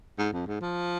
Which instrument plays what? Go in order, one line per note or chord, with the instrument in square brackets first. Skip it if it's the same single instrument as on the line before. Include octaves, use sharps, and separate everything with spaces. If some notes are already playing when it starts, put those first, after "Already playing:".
[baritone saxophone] G#2
F2
G#2
F3